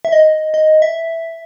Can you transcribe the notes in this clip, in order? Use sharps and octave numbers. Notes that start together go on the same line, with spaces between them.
E5
D#5
D#5
E5